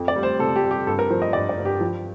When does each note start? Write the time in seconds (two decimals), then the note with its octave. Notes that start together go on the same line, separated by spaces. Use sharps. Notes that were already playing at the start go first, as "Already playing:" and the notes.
Already playing: F2
0.08 D5
0.16 G3
0.23 C5
0.39 C3 A4
0.56 G4
0.63 G3
0.71 G4
0.87 G2 A4
0.99 A#4
1.10 F3 C5
1.22 D#5
1.33 G2 D5
1.49 D5
1.58 G2
1.65 G4
1.81 F3